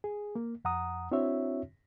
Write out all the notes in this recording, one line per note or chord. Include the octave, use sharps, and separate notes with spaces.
G#4
A#3
F2 F#5 A#5 D#6
C4 D4 E4 F#4 C#5 E5